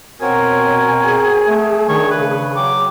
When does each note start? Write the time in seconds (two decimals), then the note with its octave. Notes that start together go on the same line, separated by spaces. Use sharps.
0.21 B2 C4 F#4 A#4 C#5 G#5
1.05 G#4
1.46 A3
1.89 D#3 D4 C#5
2.11 C#3 B4
2.56 F#3 G5 D6